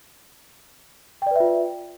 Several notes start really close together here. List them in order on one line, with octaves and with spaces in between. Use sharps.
G5 D5 B4 E5 F4